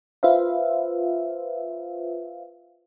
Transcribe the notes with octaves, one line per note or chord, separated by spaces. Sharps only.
F4 B4 C5 E5 F5